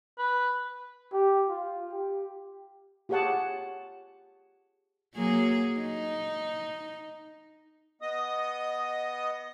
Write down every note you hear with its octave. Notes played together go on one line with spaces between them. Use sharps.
B4
G4
F4
G4
F4 G4 G#4 C#5 F#5 A5
F#3 A#3 G#4
D#4
B3 D#5 D#6